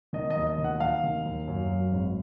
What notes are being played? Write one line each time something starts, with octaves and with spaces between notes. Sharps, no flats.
D#3 D#5
D#5
D#2
D#5
D#3
F#5
D#2 F5
D#3
D#2
F#2
F#3
G#1